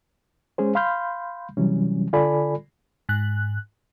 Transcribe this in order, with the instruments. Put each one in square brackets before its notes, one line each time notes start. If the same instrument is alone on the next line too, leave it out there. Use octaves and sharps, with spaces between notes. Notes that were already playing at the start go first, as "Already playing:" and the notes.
[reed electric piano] G#3 C#4 G#4 C5
F5 B5 C6 F6 G6
C3 E3 F#3 G3 C#4
D3 F4 A4 D5 G#5 B5
[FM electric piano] G#2 F#6